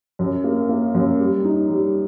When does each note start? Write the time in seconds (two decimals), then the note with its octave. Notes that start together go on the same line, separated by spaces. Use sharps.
0.19 F#2
0.44 A#3
0.69 A#3
0.94 F#2
1.20 G3
1.45 D#4
1.70 G3